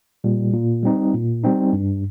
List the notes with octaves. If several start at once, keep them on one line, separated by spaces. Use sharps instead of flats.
A#2 G3
A#2
G3 C4 D#4
A#2
G3 C4 D#4
G2